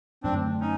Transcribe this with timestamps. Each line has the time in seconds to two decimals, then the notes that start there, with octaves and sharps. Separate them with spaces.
0.23 F#2 D3 F#3 A3 C4 D4
0.61 C#4 D#4